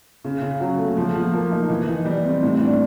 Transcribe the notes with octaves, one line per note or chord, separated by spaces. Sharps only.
C#3
C#3
F#3
A3
F3
F3
A#3
D#4
E3
D#4
G3
C4
A2
D4